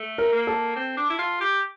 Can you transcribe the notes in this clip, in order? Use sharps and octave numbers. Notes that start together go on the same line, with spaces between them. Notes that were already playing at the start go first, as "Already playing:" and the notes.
Already playing: A3
A#4
A#3
A4
C4
D4
E4
F4
G4